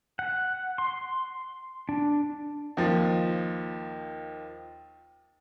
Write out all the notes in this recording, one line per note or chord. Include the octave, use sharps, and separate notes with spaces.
F#5
C6
D4
D#2 F3